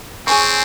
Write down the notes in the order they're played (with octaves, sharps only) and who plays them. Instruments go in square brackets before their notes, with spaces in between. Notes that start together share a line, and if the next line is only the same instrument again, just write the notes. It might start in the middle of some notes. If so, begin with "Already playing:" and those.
[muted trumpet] C4 [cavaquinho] G#4 C#5 G#5 C#6